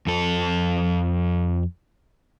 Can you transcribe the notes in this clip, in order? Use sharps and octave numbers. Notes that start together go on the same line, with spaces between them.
F2 A4